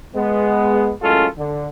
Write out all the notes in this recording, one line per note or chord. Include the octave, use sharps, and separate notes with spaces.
G#3 B3
F#2 A2 G#3 C#4 F4 A4
D3